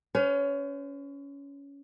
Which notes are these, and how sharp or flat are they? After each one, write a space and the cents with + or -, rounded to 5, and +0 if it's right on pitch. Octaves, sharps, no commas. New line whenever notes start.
C#4 +20 C5 -45